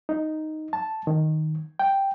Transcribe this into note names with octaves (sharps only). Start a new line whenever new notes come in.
D#4
A5
D#3
G5